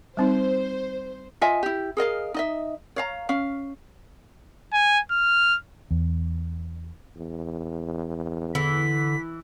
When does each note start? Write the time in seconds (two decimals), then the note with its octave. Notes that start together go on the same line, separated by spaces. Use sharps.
0.17 G3 C4 D#4 C5
1.41 F4 D#5 E5 G#5
1.63 E4 G4
1.97 G#4 A#4 D#5 F5
2.34 D#4 D#5 E5
2.96 C#5 F5 A#5
3.29 C#4 F5
4.73 G#5
5.11 F6
5.91 E2
7.17 E2
8.55 D3 E3 B6